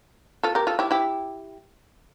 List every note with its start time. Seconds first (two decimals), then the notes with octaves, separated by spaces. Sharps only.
0.43 F4 A4
0.55 G4 A#4
0.67 F4 A4
0.79 E4 G4
0.91 E4 G4